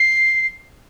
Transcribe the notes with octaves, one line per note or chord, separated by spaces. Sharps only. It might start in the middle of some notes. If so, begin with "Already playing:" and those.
Already playing: C7